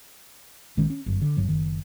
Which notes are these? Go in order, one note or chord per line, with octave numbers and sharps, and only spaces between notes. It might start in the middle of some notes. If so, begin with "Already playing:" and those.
A#1 D#3 G#3 C#4
C#4
G1 F#2
D3
G1 G2 F#3
F#1 D#3